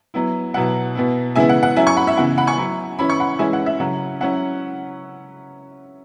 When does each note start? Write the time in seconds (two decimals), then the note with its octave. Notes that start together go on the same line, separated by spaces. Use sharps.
0.14 F#3 B3 E4
0.54 B2 F#3 E4 F#5
0.95 B2 B3 E4
1.36 C#3 E3 G#3 B3 E4 E5 G#5
1.49 F#5
1.63 F#5
1.76 F#3 C#4 E4 E5 G#5
1.86 G#5 C#6
1.97 F#5 B5
2.07 E5
2.17 C#3 E3 B3 E4 F#5
2.38 F#5 B5
2.47 G#5 C#6
2.58 F#3 E4
2.99 E3 C#4 E4 B5
3.10 C#6
3.20 F#5 B5
3.39 E3 G#3 C#4 E4 E5 G#5
3.53 F#5
3.66 E5
3.80 C#3 F#3 C#4 F#5
4.21 F#3 C#4 E4 F#5